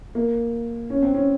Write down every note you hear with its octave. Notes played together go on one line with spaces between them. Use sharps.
A#3
C#4
C4
C#4